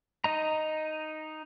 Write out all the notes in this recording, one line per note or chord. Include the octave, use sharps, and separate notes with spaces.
D#4 D#5 A#5